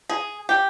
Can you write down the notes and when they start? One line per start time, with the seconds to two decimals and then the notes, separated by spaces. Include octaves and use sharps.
0.09 G#4
0.49 G4